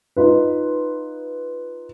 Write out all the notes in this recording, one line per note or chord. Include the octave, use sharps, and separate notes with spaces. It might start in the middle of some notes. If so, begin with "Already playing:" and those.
D#4 F4 B4